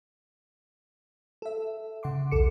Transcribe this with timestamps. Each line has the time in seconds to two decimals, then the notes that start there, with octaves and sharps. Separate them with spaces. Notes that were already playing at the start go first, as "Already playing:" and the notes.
1.42 A4 E5
2.03 C#3 F#5 C6 D6
2.31 B1 E2 A4 D6 C#7